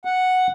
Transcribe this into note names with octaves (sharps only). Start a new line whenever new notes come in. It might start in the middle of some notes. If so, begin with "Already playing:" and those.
F#5